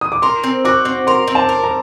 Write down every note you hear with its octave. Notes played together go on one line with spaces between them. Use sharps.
D#6
D6
A#4 C6
C4
F#4 D6
C4
A#4 C6
C4
A5
A#4
A#5